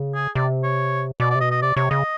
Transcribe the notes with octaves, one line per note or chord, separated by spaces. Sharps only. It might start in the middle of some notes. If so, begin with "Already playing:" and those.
Already playing: C#3
G#4
C3 D5
C#5
B2 D5
D5
C3
B2 D#5
D#5
C3 D5
C3 C#5
C#3 D#5